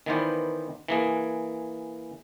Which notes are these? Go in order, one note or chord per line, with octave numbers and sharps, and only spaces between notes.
D#3 E3 B3 A#4 C5 D5
E3 A#3 G#4